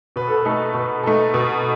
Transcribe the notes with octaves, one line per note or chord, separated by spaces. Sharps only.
B2 B4
A4
B4
A3 D#4 A4
B2 B4
A3 D#4 A4
B2